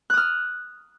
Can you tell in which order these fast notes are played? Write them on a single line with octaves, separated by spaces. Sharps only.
F#6 D#6 F6